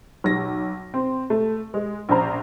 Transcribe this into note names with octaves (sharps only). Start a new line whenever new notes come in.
B1 A#6
C4
A3
G#3
A#1 C#4 C5 A#5